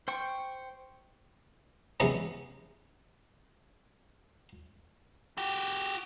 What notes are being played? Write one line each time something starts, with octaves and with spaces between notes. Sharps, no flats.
C5 G5 C#6
C3 E3 F#3 G#3 B3 C#4
F#4 G4